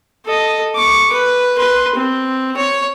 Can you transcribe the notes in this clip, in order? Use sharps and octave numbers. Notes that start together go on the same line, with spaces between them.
A4 D#5
C#6 D6
B4
B4 C6
C4
C#5